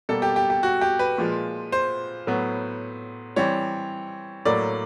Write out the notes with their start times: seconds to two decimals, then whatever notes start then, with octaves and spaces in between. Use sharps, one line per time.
0.09 B2 G3 A#3 A4
0.22 G4
0.36 G4
0.50 G4
0.63 F#4
0.81 G4
0.99 B4
1.18 A#2 F3 G#3
1.72 C5
2.27 A2 F#3 B3
3.36 E3 G3 C4 C#5
4.45 A2 F#3 A#3 D5